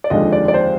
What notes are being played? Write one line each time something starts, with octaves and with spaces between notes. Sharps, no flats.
D5
F1 D#2 D3 F3 G#3 D#5
D5
D5
C5